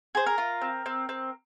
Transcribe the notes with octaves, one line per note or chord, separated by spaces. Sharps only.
G#4 C5
A#4
F4
C4
C4
C4